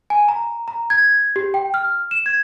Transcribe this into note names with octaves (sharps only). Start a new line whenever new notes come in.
G#5
A#5
A#5
G#6
G4
G5
F6
E7
G#6